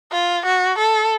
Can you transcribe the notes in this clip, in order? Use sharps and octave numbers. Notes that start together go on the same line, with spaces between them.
F4
F#4
A4